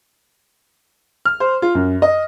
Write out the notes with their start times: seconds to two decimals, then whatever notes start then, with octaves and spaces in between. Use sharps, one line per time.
1.25 F6
1.40 C5
1.62 F4
1.75 F#2
2.02 D#5